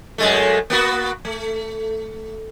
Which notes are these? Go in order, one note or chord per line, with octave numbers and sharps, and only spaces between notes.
F#2 G#3 A3
A#3 B3 F#4
A3